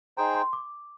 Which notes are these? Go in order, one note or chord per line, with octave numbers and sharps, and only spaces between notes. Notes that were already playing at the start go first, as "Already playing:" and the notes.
D#4 G#4 C5 G5 A#5
C6
D6